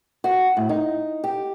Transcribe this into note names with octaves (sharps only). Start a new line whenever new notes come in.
F#4
A2
D#4
G4